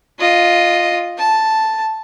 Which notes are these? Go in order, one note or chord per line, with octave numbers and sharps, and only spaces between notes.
F4 D#5
A5